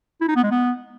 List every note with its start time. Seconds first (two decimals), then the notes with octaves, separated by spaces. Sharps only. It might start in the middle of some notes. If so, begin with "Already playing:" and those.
0.21 E4
0.28 D#4
0.36 B3
0.43 G#3
0.51 B3